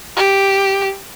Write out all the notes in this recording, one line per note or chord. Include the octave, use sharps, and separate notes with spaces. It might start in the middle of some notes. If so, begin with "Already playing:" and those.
G4